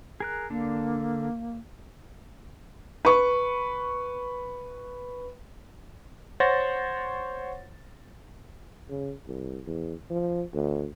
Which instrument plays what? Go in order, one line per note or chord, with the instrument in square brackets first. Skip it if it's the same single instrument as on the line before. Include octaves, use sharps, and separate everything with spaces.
[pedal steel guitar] G#4 A#4 F#6
[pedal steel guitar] D3 D4 [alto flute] A#3
[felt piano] B4 C#6
[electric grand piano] C5 C#5 F#5 A6 A#6
[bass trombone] C#3
C2
E2
F3
D2